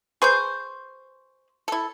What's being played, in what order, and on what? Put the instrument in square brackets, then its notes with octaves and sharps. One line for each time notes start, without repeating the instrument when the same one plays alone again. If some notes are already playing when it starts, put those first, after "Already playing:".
[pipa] G#4 B4 C5 [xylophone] C#6 G6
[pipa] E4 A4